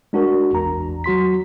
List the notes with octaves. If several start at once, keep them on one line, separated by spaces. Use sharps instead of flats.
G#3 D4 F#4 A#4
A1 E2 A#5
F#3 F#4 C6 B6